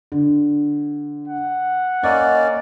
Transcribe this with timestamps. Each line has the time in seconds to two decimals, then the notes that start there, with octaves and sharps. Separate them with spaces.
0.12 D3
1.28 F#5
2.03 A#3 C#4 D5 D#5